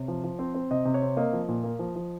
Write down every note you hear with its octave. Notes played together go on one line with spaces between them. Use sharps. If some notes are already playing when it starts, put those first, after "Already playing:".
Already playing: C3 C#5
F3
F3
C4
C4
C3 D#5
C3
C#5
C4
A#3 D#5
F3
A#2
A#3
F3
F3